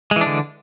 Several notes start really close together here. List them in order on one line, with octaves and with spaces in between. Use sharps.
G#3 E3 D4 D3